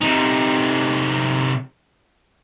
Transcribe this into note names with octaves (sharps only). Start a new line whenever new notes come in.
C3 D#4